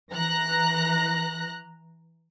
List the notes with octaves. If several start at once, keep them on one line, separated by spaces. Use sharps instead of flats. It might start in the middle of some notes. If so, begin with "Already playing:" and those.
E3 A#5 F#6 A#6